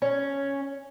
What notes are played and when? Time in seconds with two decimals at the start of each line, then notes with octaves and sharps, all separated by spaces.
0.02 C#4